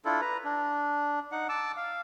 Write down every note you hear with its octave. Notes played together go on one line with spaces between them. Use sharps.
D4 E4 F4 A4
B4 A#5
D4
D#4 F#5
A5 D6 E6
F5